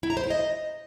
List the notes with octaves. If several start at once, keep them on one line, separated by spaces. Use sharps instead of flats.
E4
A#5
C5
E4
D#5